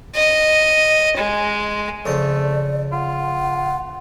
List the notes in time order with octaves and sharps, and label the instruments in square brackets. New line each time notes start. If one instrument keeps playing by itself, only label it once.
[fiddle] D#5
G#3
[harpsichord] F2 C#3 C5 [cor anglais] A3 [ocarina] D5
[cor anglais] F4 [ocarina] F#5